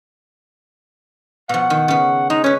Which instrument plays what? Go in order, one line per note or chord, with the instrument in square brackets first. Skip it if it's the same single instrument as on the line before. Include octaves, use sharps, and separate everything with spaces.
[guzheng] B2 F3 [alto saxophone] F#5
[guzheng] D#3
C#3 B3
[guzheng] G#3 [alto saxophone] D#4
[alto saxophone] C#4 [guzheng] B4 C#5